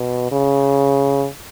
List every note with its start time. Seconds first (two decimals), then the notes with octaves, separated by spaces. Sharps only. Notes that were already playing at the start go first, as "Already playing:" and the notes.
Already playing: B2
0.32 C#3